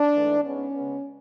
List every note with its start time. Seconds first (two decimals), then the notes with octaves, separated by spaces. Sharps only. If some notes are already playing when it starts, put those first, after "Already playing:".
Already playing: D4
0.12 G#2 E3 A3
0.42 G#2 G#3 B3 C#4
0.72 C#3 G#3 B3